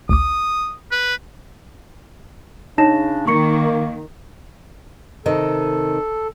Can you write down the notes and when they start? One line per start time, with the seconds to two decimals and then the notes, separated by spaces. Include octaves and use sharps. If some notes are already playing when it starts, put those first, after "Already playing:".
0.09 A1 D2 D6 D#6
0.91 B4
2.78 C#3 D4 D#4 A5 A#6 E7
3.27 D#3 A#3 C#6 C#7
5.26 C3 D#3 A4 D#5